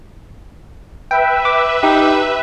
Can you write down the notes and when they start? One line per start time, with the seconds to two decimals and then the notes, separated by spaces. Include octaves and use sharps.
1.11 B4 E5 G5
1.45 D6
1.83 D#4 G4